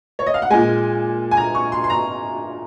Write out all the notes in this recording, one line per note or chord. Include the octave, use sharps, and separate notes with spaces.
C#5
D#5
F5
F#5
A#2 G#3 G#5
G#5
A#5
C#6
C6
C6
A#5